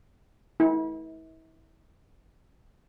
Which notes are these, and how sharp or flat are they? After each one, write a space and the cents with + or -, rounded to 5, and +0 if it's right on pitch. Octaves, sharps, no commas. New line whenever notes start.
E4 -40